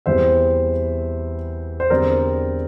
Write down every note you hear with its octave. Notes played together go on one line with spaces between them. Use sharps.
E2 E3 G3 C4 C5 E5
C5
E2 D3 G3 C4 A#4 D5